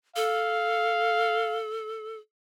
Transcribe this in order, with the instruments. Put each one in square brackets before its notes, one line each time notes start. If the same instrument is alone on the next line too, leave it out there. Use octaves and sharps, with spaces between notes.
[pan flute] A4 [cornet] F5